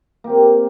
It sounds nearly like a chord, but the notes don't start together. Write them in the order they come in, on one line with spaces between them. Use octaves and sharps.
A#3 G4 C4